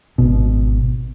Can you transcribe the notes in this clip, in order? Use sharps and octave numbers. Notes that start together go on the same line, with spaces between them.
G#1 B2